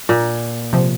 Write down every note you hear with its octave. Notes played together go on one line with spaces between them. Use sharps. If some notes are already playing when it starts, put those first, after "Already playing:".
A#2
C3 F3